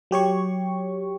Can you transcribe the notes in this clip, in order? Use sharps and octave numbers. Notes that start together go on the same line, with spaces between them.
F#3 G4 C#5 C#6